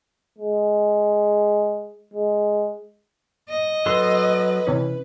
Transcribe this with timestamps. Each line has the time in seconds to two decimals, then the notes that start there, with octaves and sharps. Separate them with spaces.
0.39 G#3
2.14 G#3
3.49 D#5
3.86 F#3 A4 B4 C6
4.67 C3 E3 C#4